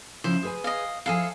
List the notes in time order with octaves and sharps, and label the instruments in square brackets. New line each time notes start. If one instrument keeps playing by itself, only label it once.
[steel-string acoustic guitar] C#3 F3 E4 [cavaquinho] C5
[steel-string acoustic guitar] G#4 B4 G#5
[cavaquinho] D#5 F5
[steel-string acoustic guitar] F3 E4 [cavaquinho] G#4 A4 F5